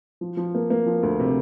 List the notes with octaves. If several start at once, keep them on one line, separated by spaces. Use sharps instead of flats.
F3
F3
A#3
A#3
F3
D2
C3